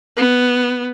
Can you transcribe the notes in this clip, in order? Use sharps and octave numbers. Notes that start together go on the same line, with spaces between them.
B3